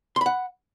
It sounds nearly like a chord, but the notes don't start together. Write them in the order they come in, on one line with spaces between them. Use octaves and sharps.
C6 B5 F#5